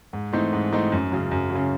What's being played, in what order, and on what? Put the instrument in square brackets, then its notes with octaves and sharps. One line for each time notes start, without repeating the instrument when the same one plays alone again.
[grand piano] G#2
E3 A3 C4 D#4
G#2
E3 A3 C4 D#4
F#2
C#3 F#3
F#2
F#3
C#3